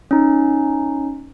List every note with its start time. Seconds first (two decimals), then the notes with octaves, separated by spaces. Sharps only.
0.11 C#4 D#4